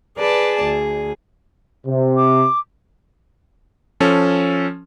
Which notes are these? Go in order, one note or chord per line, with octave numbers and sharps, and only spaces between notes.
G#4 B4 D5 A5
D2
C3
D6
F3 C#4 A4